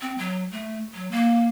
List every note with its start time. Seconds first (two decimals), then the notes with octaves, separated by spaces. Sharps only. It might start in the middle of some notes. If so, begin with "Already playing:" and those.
0.01 C4
0.18 F#3
0.52 A3
0.94 F#3
1.11 A#3